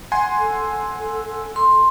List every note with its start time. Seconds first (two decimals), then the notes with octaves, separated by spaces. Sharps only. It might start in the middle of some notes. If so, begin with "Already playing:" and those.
0.12 F#5 G#5 C6
0.39 A4
1.56 C6